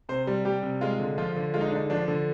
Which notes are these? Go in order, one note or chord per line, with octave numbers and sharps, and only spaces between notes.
C3 C5
G3
G3 G4
C3
G#3 F4
D3
F3 F4
D3
G#3 F4
D#4
D4
D3 D#4
F3 D4
D3